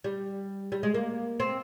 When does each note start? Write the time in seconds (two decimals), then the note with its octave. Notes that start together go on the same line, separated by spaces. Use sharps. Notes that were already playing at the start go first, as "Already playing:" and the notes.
0.04 G3
0.72 G3
0.83 G#3
0.94 A#3
1.40 C4